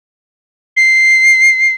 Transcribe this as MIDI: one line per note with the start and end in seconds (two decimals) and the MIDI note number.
0.76 1.74 96